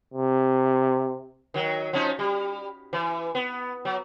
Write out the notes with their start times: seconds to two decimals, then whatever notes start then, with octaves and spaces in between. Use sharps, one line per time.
0.14 C3
1.54 D#3 F#3
1.93 F3 C#4 D#4
2.19 G3
2.93 E3
3.35 B3
3.85 F#3